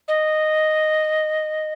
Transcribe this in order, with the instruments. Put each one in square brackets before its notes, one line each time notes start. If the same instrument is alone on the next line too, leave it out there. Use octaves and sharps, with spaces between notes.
[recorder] D#5